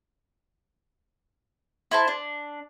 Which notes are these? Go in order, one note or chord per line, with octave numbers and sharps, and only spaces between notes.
E4 C5 A5
D4